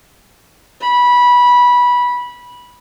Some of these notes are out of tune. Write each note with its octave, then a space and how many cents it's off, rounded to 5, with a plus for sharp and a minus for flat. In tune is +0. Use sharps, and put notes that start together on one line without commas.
B5 -15